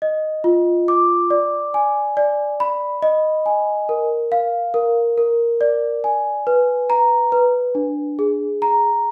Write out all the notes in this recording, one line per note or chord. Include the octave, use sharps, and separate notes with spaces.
D#5
F4
D6
D5
G#5
D5
B5
D#5
G#5
A#4
F5
A#4
A#4
D5
G#5
B4
A#5
B4
D4
G#4
A#5